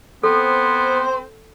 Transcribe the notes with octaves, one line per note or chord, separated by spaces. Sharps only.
B3 C4 A4 C5 C6